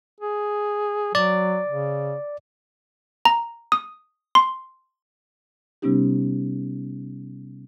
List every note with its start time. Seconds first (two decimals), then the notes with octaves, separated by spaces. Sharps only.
0.20 G#4
1.15 F#3 D5
1.68 C#3
3.25 A#5
3.72 D#6
4.35 C6
5.82 C3 G3 B3 C#4 D#4 G4